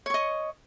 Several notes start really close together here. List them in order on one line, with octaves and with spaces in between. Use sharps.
C#5 C#6 D#5